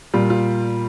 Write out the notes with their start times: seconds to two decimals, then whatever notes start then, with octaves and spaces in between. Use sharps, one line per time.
0.14 A#2 G3 F4
0.30 F4